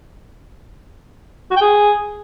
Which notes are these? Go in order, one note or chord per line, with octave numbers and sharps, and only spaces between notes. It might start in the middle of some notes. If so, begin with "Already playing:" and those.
F#4
G5
G#4